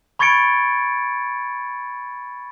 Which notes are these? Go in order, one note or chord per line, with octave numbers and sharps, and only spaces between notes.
B5 C#6 G#6 A6 C#7 D7